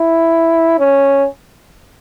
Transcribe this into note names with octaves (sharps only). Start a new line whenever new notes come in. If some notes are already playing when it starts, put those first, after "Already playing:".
Already playing: E4
C#4